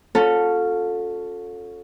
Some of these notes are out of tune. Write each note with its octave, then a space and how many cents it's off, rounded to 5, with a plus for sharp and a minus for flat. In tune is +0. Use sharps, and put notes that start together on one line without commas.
C#4 +0 F4 +45 A4 +0